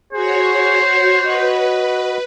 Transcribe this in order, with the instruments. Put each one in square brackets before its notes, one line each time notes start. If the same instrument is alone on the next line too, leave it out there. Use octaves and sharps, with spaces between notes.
[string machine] F#4 C#5 [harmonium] G#4 [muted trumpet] C5
[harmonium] F#4 D#5 [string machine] B4